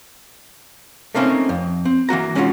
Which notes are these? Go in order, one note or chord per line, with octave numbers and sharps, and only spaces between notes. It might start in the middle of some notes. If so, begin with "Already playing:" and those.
A3 A#3 C4 C#4 D#4
F2
C4
E3 A#3 F#4 A#5
G#3 C#4 D#4 F4 F#4